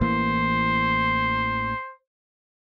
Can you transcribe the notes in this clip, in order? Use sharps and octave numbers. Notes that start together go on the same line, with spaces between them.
A1 E3 A#3 C5